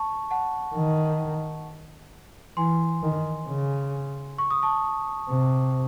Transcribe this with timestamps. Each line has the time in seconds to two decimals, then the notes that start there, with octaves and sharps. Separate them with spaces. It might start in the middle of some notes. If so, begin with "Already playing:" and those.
Already playing: A5 C#6
0.31 F#5 A5
0.76 D#3
2.57 E3 G#5 C6
3.03 D#3
3.48 C#3
4.38 C#6
4.51 D#6
4.62 A5 C#6
5.30 C3